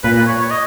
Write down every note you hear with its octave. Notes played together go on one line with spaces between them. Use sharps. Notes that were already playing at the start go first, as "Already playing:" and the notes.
A#2 B4
C#5
C#5
D#5